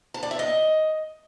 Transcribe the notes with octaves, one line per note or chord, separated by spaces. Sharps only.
A5
D5
E5
D#5